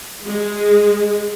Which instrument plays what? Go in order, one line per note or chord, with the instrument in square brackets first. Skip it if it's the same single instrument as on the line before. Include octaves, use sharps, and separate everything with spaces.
[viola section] G#3